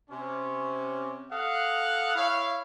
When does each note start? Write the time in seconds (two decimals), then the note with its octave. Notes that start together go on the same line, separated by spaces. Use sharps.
0.10 C3 C#4
1.32 A4 D#5 F5 F#5
2.15 E4 C#5 F5